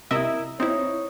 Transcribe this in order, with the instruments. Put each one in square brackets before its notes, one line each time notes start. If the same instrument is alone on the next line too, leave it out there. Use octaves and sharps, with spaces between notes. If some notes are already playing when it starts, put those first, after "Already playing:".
[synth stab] C3 D#5 E5 [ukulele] E4 A#4
[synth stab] C4 E4 [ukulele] D#4 [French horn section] C#5